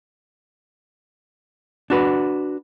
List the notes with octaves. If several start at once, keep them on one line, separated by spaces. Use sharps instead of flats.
D4 F#4 B4